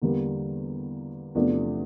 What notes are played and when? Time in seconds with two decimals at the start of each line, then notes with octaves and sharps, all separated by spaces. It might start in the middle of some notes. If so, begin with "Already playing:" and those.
0.02 E2 D3 G3 A#3
1.35 E2 C3 F3 A3 D4